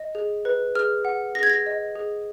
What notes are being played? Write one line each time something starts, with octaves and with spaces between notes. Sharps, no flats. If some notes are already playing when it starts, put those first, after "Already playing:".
Already playing: D#5
G#4
B4
G#4 F6
F#5
G#4 A#6
G#6
A#6
D#5
G#4